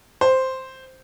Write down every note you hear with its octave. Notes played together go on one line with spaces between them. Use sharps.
C5